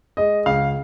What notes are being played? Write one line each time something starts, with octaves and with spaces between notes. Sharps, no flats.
G#3 D#5
C#2 F5